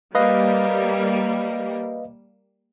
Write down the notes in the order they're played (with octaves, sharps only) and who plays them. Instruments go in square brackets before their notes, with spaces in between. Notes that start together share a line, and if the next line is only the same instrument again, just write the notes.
[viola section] G3 A#3 [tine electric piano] B4 D#5 F5